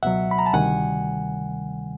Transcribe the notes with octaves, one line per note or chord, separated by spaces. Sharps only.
C#2 B2 F#3 E5 F#5
B5
A#5
A5
D2 C3 D#3 G3 F#5 G#5